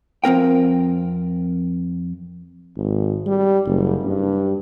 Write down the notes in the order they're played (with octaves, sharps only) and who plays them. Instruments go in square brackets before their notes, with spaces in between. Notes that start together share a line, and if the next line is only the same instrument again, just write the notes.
[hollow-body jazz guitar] F2 C4 A#4 G5
[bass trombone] G#1
G3
F#1
G2